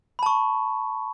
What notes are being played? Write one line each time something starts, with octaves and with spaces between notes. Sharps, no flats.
A5 B5 C#6